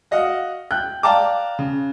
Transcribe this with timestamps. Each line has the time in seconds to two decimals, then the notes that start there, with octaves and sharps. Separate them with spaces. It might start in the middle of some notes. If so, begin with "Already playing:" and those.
0.11 F#4 D#5 F5 F#5
0.71 G5 F#6 G6
1.03 D5 F5 G5 A5 A#5 D6
1.59 C#3